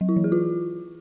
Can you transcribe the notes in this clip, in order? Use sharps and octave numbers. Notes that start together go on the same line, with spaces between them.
F#3
E4
E3
G#4
F4